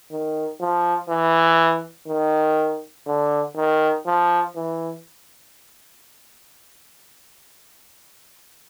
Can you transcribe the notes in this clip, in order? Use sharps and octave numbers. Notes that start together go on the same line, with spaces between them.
D#3
F3
E3
D#3
D3
D#3
F3
E3